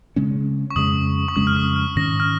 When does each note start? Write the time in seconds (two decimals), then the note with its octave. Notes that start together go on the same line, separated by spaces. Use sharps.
0.16 C#3 G#3 C#4
0.70 C#6
0.76 F2 C#3 G#3 C#4 D#6
1.28 C#6
1.36 F2 C#3 G#3 C#4 D#6
1.47 F6
1.56 D#6
1.76 F6
1.96 G#2 D#3 C#4 A#6
2.20 F6